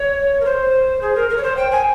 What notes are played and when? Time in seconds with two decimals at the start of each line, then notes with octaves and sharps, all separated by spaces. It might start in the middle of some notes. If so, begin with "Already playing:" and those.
Already playing: C#5
0.41 A#4
0.45 C5
1.01 G#4
1.15 A#4
1.30 A#4
1.37 C#5
1.43 C5
1.57 G5
1.71 G#5